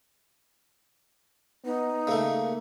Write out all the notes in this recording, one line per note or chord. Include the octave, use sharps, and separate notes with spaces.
B3 D#4
C#3 A3 A#3